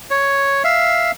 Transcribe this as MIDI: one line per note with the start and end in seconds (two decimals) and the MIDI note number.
0.11 0.63 73
0.64 1.11 76
0.64 1.11 77